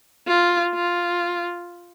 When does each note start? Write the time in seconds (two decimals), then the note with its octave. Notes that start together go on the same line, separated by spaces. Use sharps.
0.27 F4
0.74 F4